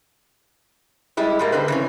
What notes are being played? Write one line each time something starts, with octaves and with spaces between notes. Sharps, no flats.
G3 G#3 E4 G4
G#2 G3 A#3
D3 A#3 C4 B4
C#3 E3 C#4